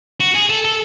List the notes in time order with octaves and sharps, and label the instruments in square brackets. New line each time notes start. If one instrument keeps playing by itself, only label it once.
[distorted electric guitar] F#4
G#4
A4
A4